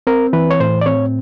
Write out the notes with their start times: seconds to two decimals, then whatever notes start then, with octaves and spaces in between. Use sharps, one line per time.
0.07 C4 A#4
0.33 E3 B4
0.51 C#5
0.60 A2 C5
0.81 D5
0.86 C4 C#5